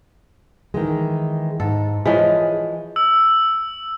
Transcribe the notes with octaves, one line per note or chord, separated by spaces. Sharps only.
D#3 E3 G#3
G#2 A4
E3 F3 G#3 G#4 C#5
E6